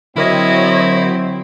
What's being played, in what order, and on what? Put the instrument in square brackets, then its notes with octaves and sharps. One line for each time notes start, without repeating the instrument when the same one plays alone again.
[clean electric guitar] D3 A#4 E5 [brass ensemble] F#3 C4 [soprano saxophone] E4 [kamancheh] C#5 D#5